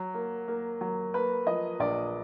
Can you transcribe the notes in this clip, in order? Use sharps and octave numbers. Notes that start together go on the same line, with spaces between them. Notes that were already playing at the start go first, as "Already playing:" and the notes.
Already playing: F#3
A#3
A#3
F#3
A#3 B4
F3 D#5
A#1 D5